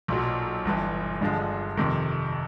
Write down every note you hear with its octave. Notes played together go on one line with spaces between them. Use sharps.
B1 A#2 F#3
G1 G2 E3
G1 G2 D3 F3 G#3
F2 C3 D#3